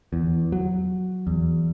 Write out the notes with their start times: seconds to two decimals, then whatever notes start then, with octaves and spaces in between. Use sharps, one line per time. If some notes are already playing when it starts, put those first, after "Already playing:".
0.13 E2
0.52 F#3
1.27 E2